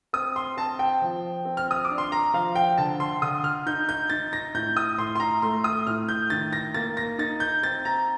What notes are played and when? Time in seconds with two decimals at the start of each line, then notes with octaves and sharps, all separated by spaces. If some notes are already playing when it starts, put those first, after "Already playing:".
0.13 C4 D#6
0.36 C6
0.57 C4 A5
0.79 G5
1.02 F3
1.45 C4
1.57 F6
1.71 D#6
1.85 D6
1.90 D4
1.98 C6
2.12 A#5
2.33 F3 F5
2.55 G5
2.78 D3 A5
3.00 C6
3.22 D3 D#6
3.44 F6
3.66 D#4 G6
3.89 G6
4.10 D#4 A6
4.33 A#6
4.54 A2 G6
4.77 D#6
4.98 A2 C6
5.15 C6
5.20 A#5
5.42 A3 C6
5.64 D#6
5.87 A2 F6
6.09 G6
6.30 D#3 A6
6.53 A#6
6.74 A#3 A6
6.97 A#6
7.18 D#4 A6
7.40 G6
7.63 C4 A6
7.85 A#5